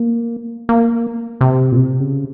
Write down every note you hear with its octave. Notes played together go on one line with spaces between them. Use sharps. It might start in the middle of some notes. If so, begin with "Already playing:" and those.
Already playing: A#3
A#3
C3
A#2
C3
C#3